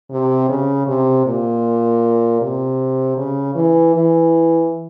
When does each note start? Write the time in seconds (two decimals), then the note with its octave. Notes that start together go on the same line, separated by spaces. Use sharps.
0.11 C3
0.49 C#3
0.87 C3
1.26 A#2
2.41 C3
3.17 C#3
3.55 E3
3.94 E3